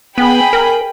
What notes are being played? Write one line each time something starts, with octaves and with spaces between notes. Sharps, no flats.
B3 G#4 G5 B5
A#4